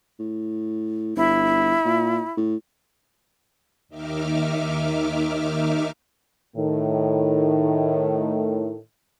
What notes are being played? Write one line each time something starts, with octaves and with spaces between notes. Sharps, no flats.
A2
G1 E4
A#2
A2
D#2 D#3 D#4 E5 D6 F6
A2 D#3